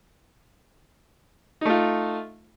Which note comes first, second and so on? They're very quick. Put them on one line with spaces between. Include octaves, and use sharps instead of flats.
D#4 A3 F4